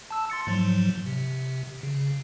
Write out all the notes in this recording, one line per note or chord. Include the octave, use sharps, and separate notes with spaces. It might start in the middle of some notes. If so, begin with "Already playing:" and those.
A5 E6
C6 A6 C#7
G#2 F3 F#3
C3
C#3